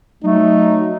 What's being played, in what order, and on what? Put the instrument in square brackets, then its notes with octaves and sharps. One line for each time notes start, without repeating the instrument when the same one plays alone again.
[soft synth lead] F#3 [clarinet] A3 [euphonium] D#4